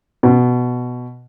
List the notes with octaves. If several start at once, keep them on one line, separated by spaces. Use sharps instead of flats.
B2